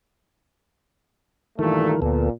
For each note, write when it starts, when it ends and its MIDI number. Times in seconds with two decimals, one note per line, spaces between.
1.59 1.95 43
1.59 1.95 46
1.59 2.00 51
1.59 2.00 52
1.59 1.95 57
1.59 2.00 70
2.02 2.30 38
2.02 2.30 46
2.02 2.30 59
2.02 2.30 69